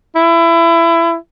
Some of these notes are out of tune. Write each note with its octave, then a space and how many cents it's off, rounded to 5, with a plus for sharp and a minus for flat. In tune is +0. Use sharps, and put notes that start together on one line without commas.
E4 +25